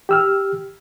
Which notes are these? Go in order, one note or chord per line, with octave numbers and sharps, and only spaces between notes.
G4 E6 F6